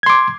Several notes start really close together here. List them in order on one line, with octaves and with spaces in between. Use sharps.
G#6 C6 D6